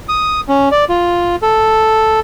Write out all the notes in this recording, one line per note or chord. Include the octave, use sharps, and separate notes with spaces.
D#6
C#4
D5
F4
A4